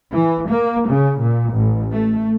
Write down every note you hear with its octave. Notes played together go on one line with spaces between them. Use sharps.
E3
A#3
C#3
A#2
A1
A3